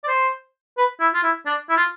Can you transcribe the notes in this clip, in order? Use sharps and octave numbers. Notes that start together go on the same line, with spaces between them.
D5
C5
B4
E4
F4
E4
D4
E4
F4